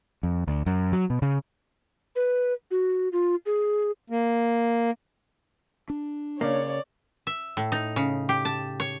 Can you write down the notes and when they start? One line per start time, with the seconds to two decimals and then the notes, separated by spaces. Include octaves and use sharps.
0.23 F2
0.48 D2
0.66 F#2
0.92 F#3
1.10 B2
1.22 C#3
2.16 B4
2.71 F#4
3.12 F4
3.46 G#4
4.10 A#3
5.90 D4
6.41 C#3 A#3 C#5 D5
7.27 E5
7.57 A2
7.72 D#4
7.96 C#3
8.29 G4
8.45 A5
8.80 C#5